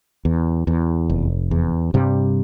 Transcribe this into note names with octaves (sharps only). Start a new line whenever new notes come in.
E2
E2
F1
E2
G2 C3 G3